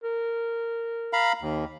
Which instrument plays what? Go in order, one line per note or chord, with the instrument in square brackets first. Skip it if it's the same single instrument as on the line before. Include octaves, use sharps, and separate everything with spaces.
[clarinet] A#4
[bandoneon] F5 A#5 B5
D#2